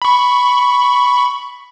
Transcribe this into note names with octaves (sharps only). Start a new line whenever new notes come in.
B5 C#6